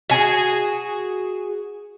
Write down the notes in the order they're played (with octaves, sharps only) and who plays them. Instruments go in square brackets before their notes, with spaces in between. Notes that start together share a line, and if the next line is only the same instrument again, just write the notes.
[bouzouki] F#4 G#4